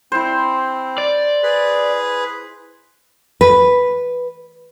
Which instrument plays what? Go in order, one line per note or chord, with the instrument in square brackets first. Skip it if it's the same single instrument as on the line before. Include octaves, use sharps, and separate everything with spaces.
[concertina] C4 [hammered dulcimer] E4 C5
[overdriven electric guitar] D5
[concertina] G#4 B4
[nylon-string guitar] B4